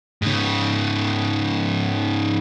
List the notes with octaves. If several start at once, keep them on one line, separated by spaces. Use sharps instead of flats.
G#2 C#3